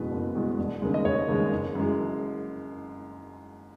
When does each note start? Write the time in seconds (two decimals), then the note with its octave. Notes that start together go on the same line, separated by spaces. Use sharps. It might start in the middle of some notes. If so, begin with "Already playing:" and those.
Already playing: F#1 E2 B2 G#3 B4
0.11 F#1
0.35 E2 B2 G#3
0.58 E1
0.82 D#2 C#3 G#3
0.94 D#5
1.05 E1 C#5
1.28 D#2 C#3 G#3
1.52 F#1
1.75 F#2 E3 G#3